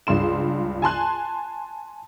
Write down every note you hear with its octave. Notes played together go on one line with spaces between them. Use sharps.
C#2 G2 C6 E7
G#5 A5 C6 F#6